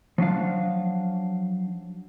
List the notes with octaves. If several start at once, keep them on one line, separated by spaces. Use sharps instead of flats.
F3 F#3 D4 F5